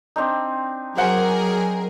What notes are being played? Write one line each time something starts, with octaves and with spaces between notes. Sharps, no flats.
C4 D4 D#4
F#3 F#4 G#4 A#4 C5 F#5